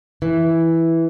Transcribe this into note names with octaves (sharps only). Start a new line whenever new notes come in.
E3